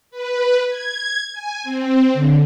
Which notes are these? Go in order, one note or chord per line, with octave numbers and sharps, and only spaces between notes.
B4
G#6
G#5
C4
D3